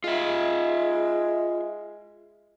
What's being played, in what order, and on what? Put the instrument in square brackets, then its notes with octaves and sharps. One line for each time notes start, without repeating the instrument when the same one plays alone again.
[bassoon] G#3 [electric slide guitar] F4 E5